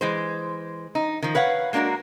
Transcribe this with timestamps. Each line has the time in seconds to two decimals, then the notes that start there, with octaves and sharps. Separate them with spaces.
0.01 E3 G#3 C5
0.95 D#4
1.23 D#3 F3
1.35 B4 C#5 F5 F#5
1.73 G#3 A#3 D4 F#4 A#4